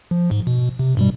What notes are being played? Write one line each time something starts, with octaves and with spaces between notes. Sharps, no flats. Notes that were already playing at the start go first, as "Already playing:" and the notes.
F3
G#2
B2
C3
G2 B2 G3